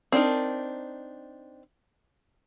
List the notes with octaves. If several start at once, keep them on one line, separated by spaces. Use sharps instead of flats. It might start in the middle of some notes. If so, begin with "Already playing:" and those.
C4 D4 D#4 A#4